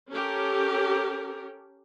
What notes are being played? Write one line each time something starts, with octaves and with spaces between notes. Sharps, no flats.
C#4 G4 A4 A#4